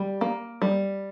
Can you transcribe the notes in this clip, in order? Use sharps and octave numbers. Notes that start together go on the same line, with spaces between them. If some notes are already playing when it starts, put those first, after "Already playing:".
Already playing: G3
A#3
G3